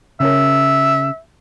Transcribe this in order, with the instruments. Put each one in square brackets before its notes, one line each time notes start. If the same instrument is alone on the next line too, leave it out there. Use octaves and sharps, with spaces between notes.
[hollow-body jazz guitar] C#3 C#4 A#4 [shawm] E5